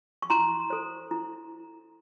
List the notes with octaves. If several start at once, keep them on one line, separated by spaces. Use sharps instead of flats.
C#6
E4 A#5 C6
A4 C5
E4